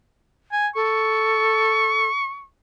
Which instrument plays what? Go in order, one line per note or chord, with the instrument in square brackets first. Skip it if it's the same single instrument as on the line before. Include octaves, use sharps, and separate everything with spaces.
[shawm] G#5
[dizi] A4 [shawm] C#6